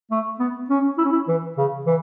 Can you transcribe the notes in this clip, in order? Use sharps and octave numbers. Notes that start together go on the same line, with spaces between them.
A3
B3
C#4
E4
C#4
E4
E3
C#3
E3